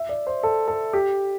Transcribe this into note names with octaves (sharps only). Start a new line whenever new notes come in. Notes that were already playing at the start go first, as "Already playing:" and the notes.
Already playing: E5
D5
C5
A4
A4
G4